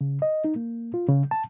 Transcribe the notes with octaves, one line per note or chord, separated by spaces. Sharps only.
C#3
D#5
D#4
A#3
F4
C#3
A5